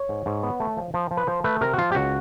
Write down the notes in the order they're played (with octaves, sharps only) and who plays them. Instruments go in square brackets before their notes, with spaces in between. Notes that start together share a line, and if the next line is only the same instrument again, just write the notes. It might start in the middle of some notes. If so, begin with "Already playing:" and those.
Already playing: [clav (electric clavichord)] C#5
G#2
G#2
B3
A3
F3
F3
F3
B4
F3 C5
A3 B4
C3 A#4
F#4
F3 F4
G4
C#2 F#4